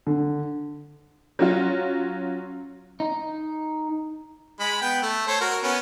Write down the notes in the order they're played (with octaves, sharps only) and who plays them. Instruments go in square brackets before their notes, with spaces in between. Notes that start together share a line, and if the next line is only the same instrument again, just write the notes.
[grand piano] D3
[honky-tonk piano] F#3 C#4 F4
[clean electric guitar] D#4
[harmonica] G#3 B5
B3 G5
A3
A4 C5 C#5
F#4 A#4
B3 C#4